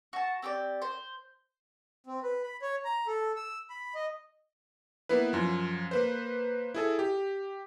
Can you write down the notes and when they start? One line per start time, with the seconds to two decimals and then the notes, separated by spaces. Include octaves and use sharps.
0.13 F#4 A5
0.42 C4 G4 A#4 D5
0.82 C5
2.07 C4
2.23 B4
2.43 B5
2.62 C#5
2.85 A#5
3.07 A4
3.36 E6
3.70 B5
3.95 D#5
5.09 A#3 B3 E4 B4
5.33 F#2 F3
5.91 A#3 B4 C5
6.74 E4 G#4 A4
6.99 G4